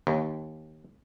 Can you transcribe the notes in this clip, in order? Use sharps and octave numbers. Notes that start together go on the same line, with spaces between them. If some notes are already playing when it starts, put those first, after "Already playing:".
D#2